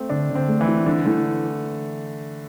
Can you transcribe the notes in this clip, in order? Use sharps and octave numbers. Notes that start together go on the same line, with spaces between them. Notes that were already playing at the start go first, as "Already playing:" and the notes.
Already playing: A3 C4
D3 D4
D3
C4
A3
E3
E4
D3 E3
E3 A3